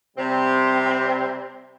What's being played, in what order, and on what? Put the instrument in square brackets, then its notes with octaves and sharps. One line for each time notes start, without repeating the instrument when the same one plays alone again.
[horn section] C3 G3 C4